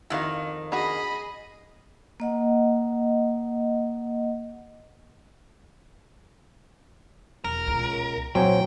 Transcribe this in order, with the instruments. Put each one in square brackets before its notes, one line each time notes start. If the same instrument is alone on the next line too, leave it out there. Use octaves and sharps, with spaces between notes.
[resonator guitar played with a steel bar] F2 D#3 [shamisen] E4 F#4 F5
[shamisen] D4 F#4 [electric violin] G#4 D#5 [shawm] B5
[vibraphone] A#3 D#5 F#5
[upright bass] E1 [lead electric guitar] A#4
[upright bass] C#2 B2
[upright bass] A#2 [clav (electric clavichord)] F#3 C4 G#5 [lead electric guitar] G5